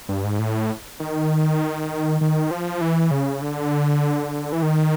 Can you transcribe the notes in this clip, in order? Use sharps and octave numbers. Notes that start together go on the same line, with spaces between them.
G2
G#2
A2
D#3
D#3
F3
E3
C#3
D3
E3
D#3